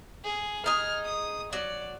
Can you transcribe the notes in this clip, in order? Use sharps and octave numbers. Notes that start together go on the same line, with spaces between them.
G#4
D#4 G#4 F6
D#6
F#3 D5